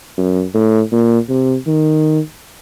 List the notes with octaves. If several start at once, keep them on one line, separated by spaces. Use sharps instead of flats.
F#2
A2
A#2
C3
D#3